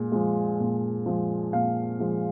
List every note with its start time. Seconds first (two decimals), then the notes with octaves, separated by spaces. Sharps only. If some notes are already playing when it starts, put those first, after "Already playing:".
Already playing: A#2 G#3
0.12 F3 G#3
0.59 A#2
1.06 F3 G#3
1.53 A#2 F5
2.00 F3 G#3